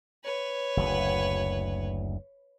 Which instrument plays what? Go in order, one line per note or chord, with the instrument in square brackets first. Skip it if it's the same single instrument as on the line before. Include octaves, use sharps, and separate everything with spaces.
[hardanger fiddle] B4 C#5
[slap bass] F#1 D2